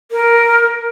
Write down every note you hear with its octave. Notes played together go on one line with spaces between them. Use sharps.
A#4